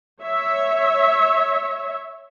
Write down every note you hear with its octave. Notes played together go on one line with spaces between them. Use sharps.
C#5 E5